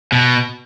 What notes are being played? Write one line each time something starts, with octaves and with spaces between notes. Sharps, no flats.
B2